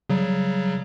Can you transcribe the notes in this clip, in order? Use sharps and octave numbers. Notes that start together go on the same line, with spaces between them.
C#3 F#3 G3